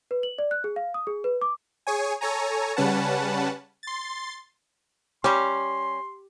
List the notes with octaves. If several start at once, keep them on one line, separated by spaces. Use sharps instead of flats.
B4
F#7
D5
F#6
G#4
F5
D#6
G#4
B4
D6
G#4 C#5 G#5
A4 C#5 G#5 A#5
C#3 G3 C#4 B4 F#5 A5
C6 A6
G3 C#4 G4 C6